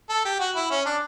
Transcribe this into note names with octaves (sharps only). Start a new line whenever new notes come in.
A4
G4
F#4
E4
C#4
D4